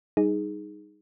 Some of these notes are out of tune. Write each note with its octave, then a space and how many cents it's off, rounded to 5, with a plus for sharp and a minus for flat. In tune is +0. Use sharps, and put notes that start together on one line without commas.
G3 +0 D#4 +0 G#4 +0